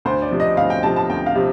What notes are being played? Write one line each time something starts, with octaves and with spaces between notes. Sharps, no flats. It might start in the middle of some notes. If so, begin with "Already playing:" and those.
D2 C5
D5
C3 F3
D#5
D2 F5
G5
C3 F3 A5
A5
D2 G5
F5
C3 F3